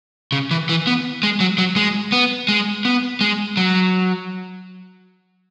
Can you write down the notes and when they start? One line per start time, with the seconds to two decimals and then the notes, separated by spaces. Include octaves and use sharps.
0.32 C#3
0.51 E3
0.69 E3
0.87 B3
1.23 G#3
1.40 F#3
1.58 F#3
1.76 G#3
2.12 B3
2.49 G#3
2.85 B3
3.21 G#3
3.57 F#3